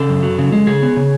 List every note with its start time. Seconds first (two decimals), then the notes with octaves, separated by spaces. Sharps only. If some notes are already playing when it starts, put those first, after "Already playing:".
Already playing: C#3 A4
0.09 F#2
0.23 F#3
0.39 C#3
0.52 G#3
0.67 C#3 G#4
0.82 B3
0.96 C#3